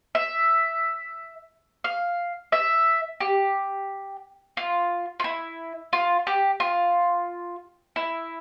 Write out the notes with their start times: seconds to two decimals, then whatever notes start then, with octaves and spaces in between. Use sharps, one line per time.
0.15 E5
1.84 F5
2.52 E5
3.20 G4
4.57 F4
5.20 F4
5.24 E4
5.93 F4
6.27 G4
6.60 F4
7.96 E4